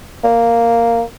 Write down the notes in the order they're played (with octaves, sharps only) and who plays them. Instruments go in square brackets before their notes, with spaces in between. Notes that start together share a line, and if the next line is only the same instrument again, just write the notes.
[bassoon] A#3